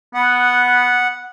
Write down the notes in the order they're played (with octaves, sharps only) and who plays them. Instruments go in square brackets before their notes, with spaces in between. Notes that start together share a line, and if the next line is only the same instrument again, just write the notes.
[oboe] B3 [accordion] F#5